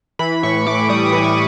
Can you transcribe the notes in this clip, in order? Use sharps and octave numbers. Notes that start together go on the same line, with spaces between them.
E3 B5
A2 C#6
A2 D6
G3 D#6
D#6
E3
C#6